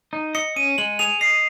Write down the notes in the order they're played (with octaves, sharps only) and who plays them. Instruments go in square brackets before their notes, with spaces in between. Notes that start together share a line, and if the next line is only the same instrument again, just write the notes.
[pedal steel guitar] D#4
[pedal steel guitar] D#5 [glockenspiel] C#7
[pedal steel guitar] C#4 [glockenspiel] D#7
[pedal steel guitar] G#3 [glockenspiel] F#7
[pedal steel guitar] G#4 [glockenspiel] F7
[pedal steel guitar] D#5 [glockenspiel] C7